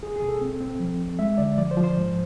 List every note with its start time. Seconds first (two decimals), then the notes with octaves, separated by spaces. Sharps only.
0.02 E2 G#4
0.16 G#4
0.22 B2
0.29 A4
0.41 C4
0.61 C4
0.80 F3
0.99 F2
1.19 G#3 E5
1.38 D3 D5
1.58 F3 D5
1.71 C5
1.77 F3
1.84 C5
1.97 G#2